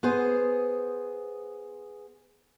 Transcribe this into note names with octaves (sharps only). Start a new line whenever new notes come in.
B3 G#4 C5